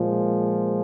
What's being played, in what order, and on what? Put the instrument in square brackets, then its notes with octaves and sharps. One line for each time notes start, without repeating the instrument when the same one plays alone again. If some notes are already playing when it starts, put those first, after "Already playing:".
Already playing: [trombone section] A#2 F3 G#3